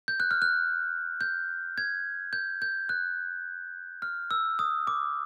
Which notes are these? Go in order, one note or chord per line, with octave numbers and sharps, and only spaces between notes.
G6
F#6
F6
F#6
G6
G#6
G6
G6
F#6
F6
E6
D#6
D6